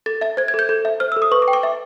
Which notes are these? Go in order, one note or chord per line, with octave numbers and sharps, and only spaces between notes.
A4 A6
E5 A6
C5 G#6
G#6
A4 G6
A4
E5
C5 F6
E6
A4
D#6
B4 C#6
D6
G5
D6
E5